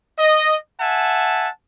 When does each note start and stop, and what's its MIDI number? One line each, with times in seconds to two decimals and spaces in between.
0.18 0.56 75
0.80 1.49 76
0.80 1.49 78
0.80 1.49 80
0.80 1.49 81